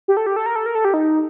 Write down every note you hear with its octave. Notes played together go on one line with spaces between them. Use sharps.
G4
A4
G4
A4
A#4
A4
A#4
A4
G4
D#4